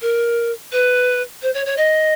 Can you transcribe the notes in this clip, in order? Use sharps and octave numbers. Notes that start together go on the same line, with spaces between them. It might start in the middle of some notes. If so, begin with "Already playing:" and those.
A#4
B4
C5
C#5
C#5
D#5